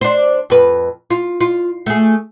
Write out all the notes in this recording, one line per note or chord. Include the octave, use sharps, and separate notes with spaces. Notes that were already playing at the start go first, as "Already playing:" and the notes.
D4 C5
F2 B4
F4
F4
A3 G#4